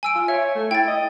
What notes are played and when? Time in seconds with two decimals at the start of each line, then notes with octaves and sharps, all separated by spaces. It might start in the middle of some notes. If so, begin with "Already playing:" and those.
0.03 G#5 E6 D7
0.15 F4
0.28 C#5 E5
0.55 A3
0.71 E4 G5 A6
0.88 D#5